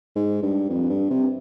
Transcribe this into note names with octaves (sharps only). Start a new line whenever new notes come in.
G#2
G2
F2
G2
C3